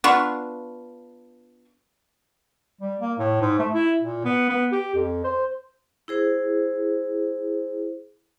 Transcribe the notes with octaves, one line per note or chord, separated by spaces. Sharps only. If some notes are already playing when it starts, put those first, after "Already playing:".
B3 D4 F4 C#6
G3
A#3
A2
G#2
A3
E4
A#2
B3
B3
G4
F2
C5
E4 G#4 C5